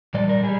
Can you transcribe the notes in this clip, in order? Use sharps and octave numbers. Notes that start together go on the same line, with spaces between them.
A#2 G3 D5
A#4
G3 G#4